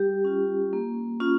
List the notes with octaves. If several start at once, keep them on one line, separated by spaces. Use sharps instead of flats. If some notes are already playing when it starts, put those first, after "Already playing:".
Already playing: G3 G4
C#4 F4
A#3
C#4 F4